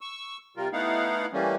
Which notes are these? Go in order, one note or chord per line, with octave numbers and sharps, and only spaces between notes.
C#6 E6
C3 G3 F4 A#4
A3 B3 D#4 E4 F5 F#5
E3 G3 A3 A#3 C#4